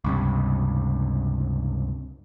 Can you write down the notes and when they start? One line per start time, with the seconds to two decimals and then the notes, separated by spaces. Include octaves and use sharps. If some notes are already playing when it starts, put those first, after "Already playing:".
0.04 C#2 G2 C3